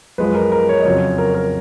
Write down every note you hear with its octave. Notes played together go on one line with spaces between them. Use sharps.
F#2 F3 G#3 B4
A#4
A#4
C#5
D#5
F2 C#3 F#3 C#5
A#4
A#4